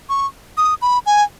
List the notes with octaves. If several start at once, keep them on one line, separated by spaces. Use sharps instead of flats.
C#6
D#6
B5
G#5